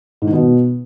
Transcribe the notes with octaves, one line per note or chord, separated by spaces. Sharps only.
G#2
D#3
B2